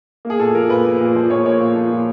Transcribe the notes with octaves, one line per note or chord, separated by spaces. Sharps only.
A#3
G#4
A#2 A4
F3 A#4
A#2 B4
A#3
A#2
F3 C5
A#2 C#5
A#3 C#5
A#2
F3
A#2